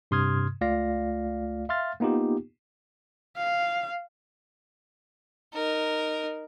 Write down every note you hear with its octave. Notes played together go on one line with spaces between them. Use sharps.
G2 C3 C6 D#6 F6 G#6
C#2 A3 F4 D5 F5 A#6
E5 F5 C6 F6 A6
A#3 B3 D#4 F4 G4
F5
D#4 A#4